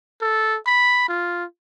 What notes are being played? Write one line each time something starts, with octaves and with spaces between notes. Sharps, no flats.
A4
B5
F4